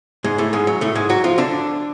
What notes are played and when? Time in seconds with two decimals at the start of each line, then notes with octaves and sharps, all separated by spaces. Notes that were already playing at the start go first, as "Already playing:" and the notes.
0.24 G#2 G#3
0.38 A2 A3
0.53 G#2 G#3
0.67 F#3
0.81 A2 A3
0.95 G#2 G#3
1.10 F#3 F#4
1.24 F3 F4
1.38 D3 D4